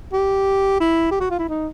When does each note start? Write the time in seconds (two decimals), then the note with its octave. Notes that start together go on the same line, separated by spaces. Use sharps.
0.13 G4
0.80 E4
1.11 G4
1.21 F#4
1.30 F4
1.39 E4
1.49 D#4